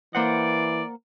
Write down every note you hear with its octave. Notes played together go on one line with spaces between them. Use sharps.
E3 A#3 C5 D5 F#5